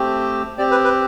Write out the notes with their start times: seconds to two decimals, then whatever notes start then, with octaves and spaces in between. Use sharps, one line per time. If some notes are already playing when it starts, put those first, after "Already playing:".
Already playing: A3 C4 G4
0.58 C4 G4 D5
0.71 B4
0.84 B4